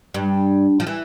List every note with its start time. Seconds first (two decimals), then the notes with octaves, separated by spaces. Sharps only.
0.14 G2
0.80 F3
0.87 E3